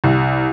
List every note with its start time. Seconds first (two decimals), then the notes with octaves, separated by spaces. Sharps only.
0.04 C2